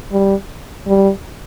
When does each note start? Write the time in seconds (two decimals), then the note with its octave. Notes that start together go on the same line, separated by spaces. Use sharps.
0.12 G3
0.87 G3